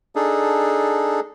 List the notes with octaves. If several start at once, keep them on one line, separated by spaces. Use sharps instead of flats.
D4 D#4 G#4 A4